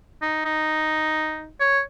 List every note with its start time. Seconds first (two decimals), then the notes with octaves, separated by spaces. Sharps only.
0.22 D#4
0.45 D#4
1.60 C#5